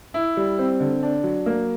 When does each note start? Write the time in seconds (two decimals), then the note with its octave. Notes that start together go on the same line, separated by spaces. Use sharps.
0.14 E4
0.37 G3
0.59 C4
0.80 D3
1.03 D4
1.24 F#3
1.46 A#3